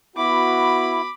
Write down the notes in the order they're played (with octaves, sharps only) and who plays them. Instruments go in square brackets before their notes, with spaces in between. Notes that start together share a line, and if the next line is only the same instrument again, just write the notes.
[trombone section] B3 F#4 [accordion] E4 [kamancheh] B5 D6